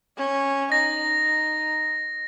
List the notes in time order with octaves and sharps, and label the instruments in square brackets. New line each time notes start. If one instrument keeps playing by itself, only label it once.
[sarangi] C#4
[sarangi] D#4 [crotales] A#6